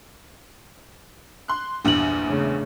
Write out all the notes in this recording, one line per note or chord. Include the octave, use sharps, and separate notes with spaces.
C6 F#6
A#1 E2 G2 D4 F#7
C#3 A3